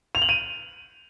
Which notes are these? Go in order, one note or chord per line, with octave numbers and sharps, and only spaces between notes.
F7
F#7
D#7